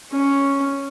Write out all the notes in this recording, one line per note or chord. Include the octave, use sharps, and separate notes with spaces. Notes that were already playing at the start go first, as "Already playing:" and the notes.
C#4